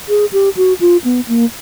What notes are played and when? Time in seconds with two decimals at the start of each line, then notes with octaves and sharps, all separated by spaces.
0.09 G#4
0.33 G4
0.57 F#4
0.80 F4
1.04 B3
1.28 A#3